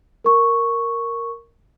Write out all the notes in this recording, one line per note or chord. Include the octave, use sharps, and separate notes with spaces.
A#4 C#6